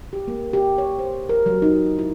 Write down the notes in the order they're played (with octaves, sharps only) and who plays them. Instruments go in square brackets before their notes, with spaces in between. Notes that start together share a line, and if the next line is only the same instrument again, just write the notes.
[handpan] G4
A#3
G4
C#5
C5
A#4
F#3
D#4
E4